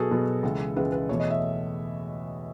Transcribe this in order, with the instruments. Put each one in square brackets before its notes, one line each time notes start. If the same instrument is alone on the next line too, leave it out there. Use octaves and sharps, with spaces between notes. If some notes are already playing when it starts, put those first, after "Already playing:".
Already playing: [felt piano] B2 F#3 B3 F#4 G#4 A4
B2 F#3 B3
C#2 C#3 E3 G#3
C#2 C#3 E3 G#3 B4
B4
E2 B2 A3 C#5
D#5
E5